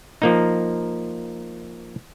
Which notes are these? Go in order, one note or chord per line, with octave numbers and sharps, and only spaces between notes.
F3 A#3 D#4